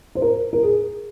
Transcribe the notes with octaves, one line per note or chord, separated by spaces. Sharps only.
C5
A#4
A#4
G#4